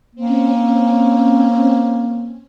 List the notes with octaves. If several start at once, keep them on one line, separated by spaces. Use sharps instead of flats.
A#3 C4 C#4